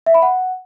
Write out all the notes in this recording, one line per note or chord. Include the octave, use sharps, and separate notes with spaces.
E5
B5
F#5